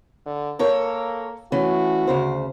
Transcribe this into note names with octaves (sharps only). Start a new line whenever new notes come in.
D3
A#3 A4 A#4 C#5
E3 A3 C#4 F#4
D2 C#3 C5